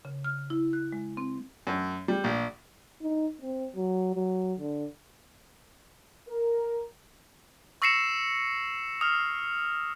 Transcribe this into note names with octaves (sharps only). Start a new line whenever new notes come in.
C#3
F6
E4
F#6
G#3
C4
F#2
G3
A#1
D#4
C4
F#3
F#3
D3
A#4
C#6 E6 A#6 C7 C#7 E7
D#6 F6